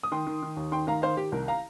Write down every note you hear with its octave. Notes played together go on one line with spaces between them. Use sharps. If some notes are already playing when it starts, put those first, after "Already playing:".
D#6
D#3 G5 C6
D#3
D#3
D#2
D#3 G5 C6
D#3 F5 A#5
D#3 C5 F5
D#3 G4
C2 A#4
F5 A#5